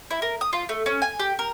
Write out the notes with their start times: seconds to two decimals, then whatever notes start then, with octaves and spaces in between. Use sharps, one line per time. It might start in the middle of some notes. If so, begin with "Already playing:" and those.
0.11 E4
0.22 A#4
0.41 D#6
0.53 F4
0.69 A3
0.86 C#4
1.02 G#5
1.20 G4
1.39 A#4